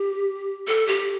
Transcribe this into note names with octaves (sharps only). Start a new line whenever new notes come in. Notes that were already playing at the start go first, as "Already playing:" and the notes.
Already playing: G4
A4
G4